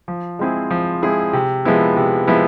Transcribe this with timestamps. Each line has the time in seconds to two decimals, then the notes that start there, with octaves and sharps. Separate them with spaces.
0.08 F3
0.39 G#3 C4 E4 G#4
0.70 F3
1.02 G#3 C4 E4 G#4
1.33 C3
1.65 F3 G#3 B3 E4
1.96 C3
2.27 F3 G#3 B3 E4